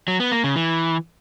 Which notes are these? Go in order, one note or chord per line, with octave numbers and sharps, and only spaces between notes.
F#3
B3
A#3
C#3
E3